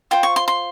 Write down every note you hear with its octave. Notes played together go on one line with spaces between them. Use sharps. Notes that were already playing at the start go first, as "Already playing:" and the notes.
F4 C5 G5
C#6
C6
C6